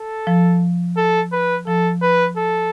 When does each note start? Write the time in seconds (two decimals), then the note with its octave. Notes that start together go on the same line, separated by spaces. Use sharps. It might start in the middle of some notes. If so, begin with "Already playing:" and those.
Already playing: A4
0.27 F3
0.97 A4
1.32 B4
1.67 F3 A4
2.02 B4
2.37 A4